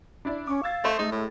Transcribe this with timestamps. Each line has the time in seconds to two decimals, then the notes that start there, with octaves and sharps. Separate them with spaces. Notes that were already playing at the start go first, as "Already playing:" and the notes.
0.25 D4 E4 D5
0.47 C#4 C#6 D6
0.63 F5 E6 G#6 A6
0.85 A3 C5 D#5 C#6
0.99 G#3 A3 D#4
1.12 A2